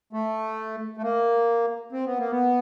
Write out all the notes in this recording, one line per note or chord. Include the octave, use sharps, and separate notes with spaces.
A3
A3
A#3
C4
B3
A#3
B3